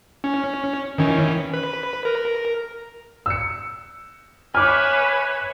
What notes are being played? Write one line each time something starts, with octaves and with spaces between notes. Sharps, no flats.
C#4
D#3 E3 C#4
B4
A#4
E6 C#7
B4 C#5 E5 G#5 D6 F6